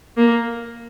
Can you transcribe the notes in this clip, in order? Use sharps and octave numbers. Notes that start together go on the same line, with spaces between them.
A#3